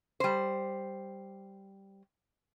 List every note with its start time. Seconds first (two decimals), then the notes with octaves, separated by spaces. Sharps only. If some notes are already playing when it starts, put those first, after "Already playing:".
0.20 G3 C5